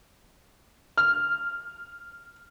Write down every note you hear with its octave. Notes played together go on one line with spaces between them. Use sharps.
F6